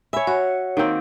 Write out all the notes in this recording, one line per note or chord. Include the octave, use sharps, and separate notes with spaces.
C#5 E5 G#5 B5
F#4 C#5
D#3 A#3 C4